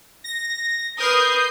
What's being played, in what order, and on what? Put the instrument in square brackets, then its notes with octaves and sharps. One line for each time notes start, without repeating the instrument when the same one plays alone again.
[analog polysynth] A#6
[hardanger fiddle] A#4 B4 [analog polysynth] D#6 G6 C7